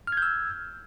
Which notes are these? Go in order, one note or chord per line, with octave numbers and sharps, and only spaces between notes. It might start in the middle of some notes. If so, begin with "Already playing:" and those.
E6 F6 G6 G#6